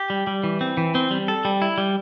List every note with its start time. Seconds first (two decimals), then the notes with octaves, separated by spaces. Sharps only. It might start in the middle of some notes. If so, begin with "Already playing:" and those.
Already playing: G4
0.10 G3
0.27 G3
0.44 E3
0.61 C4
0.77 E3
0.95 C4
1.11 G3
1.28 A4
1.45 G3
1.62 E4
1.78 G3